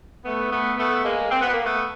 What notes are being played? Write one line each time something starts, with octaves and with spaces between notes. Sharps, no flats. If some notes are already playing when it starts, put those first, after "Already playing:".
A3 B3
A3 B3
A3 B3
G#3 A#3
C4
B3
A#3
A3 B3